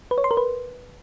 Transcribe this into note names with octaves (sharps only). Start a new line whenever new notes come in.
B4
C#5
C6
A#4
B4